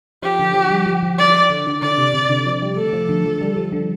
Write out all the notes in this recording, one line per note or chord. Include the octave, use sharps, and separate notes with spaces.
F3 G4
D3
F3
G3
F3
F3
D5
D3
D3
D3 D5
C3
C3
D3
F3
G3
A3 A4
F3
D3
F3
G3
F3
D3